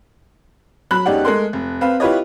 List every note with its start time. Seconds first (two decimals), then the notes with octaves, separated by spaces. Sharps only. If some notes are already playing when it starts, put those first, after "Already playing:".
0.91 F#3 B5 F#6
1.06 E1 C#4 D#4 G4 D5 F#5
1.25 G#3 A3 A#4 C6
1.53 F1
1.81 C4 B4 F5
2.00 E4 F4 G4 B4 C#5 D#5